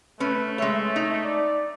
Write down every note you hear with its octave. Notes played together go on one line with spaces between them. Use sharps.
A3 C#4 B4
G#3 C#5 E5
D#4
D5